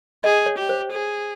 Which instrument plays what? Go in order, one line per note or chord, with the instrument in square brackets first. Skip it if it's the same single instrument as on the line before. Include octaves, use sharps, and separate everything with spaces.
[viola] G#4 [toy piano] D#5
[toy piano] C#5
[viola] G4
[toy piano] C5
[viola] G#4